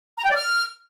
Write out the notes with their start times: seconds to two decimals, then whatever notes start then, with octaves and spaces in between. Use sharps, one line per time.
0.18 A#5
0.24 G5
0.30 D5
0.36 F6